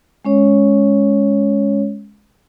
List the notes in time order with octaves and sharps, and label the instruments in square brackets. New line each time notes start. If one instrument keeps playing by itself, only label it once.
[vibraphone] G#3 C#4 C#5